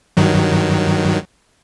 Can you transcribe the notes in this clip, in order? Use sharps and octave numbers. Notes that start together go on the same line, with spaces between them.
G2 D#3 F#3